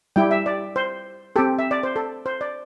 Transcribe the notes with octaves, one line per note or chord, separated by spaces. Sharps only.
G3 E4 G4 G5
E5
D5
C5
C4 G4 A4
E5
D5
C5
A4
C5
D5